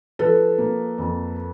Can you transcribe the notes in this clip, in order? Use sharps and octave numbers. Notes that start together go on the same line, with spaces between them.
F3 A4 B4
A#3
F2